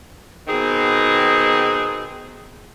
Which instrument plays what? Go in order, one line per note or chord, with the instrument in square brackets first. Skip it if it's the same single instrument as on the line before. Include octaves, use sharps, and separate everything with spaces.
[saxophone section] B2 D#3 C4 D#4 G#4